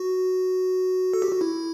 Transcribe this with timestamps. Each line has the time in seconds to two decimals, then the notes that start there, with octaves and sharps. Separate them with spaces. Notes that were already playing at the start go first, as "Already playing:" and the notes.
Already playing: F#4
1.14 A4
1.22 G4
1.32 F#4
1.41 E4